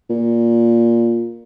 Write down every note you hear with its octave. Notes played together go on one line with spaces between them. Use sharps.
A#2